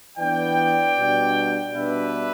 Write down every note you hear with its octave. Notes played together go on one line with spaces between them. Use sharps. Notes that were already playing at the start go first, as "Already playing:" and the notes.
E3 B3 D4 D5 G5
B2 G3 D4
B2 G3 B3 D4 B4 E5